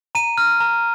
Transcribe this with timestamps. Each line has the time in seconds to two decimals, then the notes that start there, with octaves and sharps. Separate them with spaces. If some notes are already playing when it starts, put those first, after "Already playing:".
0.15 A#5 D#7
0.38 F6
0.60 A#5